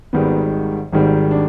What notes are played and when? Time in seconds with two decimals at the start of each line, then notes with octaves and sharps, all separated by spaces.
0.13 G#1 G#2 D#3 G3 B3
0.93 G#1 G#2 D#3 G3
1.31 D4